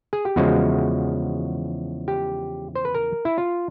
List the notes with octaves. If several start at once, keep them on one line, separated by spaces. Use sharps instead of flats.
G#4
G4
E2 C#3 F3 G#3 F#4
G4
C5
B4
A#4
E4
F4